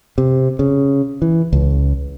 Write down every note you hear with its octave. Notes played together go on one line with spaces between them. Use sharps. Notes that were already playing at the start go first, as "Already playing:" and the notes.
C3
C#3
E3
C#2